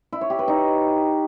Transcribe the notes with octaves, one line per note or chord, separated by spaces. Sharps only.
E4
C#5
G4
B4
D#4